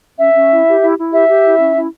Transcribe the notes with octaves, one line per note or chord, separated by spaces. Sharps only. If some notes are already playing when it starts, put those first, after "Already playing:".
C#4 E5
C#4
E4
G4
E4
E4
G4 E5
G4
E4
C#4
E4